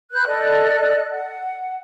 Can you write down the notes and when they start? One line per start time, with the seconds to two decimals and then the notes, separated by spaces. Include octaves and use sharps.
0.12 B4 F#6 G6
0.26 A4 D5 D#5 F#6
1.11 F#5